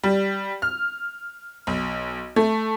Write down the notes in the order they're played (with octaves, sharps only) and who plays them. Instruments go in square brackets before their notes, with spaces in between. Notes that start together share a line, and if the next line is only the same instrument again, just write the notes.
[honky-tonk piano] G3
F6
B1
A3